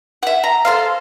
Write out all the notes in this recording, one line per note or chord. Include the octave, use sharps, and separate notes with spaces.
E5 F#5
A#5
A4 C5 F5